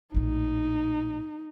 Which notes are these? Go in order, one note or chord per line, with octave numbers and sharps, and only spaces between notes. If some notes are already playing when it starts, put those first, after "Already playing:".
A#1 A2 D#4